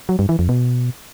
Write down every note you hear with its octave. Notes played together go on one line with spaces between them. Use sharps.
F#3
G2
E3
F2
B2